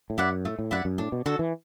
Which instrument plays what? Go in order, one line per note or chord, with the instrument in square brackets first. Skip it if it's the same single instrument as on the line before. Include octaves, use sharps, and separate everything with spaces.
[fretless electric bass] A2
[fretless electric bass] F#2 [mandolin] E4 D5 F#5
[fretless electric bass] A2 [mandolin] A3
[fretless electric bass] A2
[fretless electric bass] F#2 [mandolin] E4 D5 F#5
[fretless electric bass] F#2
[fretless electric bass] A2 [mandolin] D4
[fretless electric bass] B2
[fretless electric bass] D3 [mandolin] F#4 A4
[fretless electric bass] E3